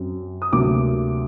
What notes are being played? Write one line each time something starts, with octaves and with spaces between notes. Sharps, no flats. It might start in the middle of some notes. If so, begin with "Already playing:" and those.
Already playing: F#2 F#3 C4
D#6
D2 C3 F#3 A#3 D6